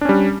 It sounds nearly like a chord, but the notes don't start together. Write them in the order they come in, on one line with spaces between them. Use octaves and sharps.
D4 C#4 G3